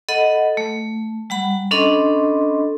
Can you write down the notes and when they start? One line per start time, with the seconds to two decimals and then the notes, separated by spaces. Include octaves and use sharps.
0.09 A4 D#5 F#5 B5
0.57 A3
1.30 G3 F#5 B5
1.71 C#4 D4 A4 D#5 B5 C6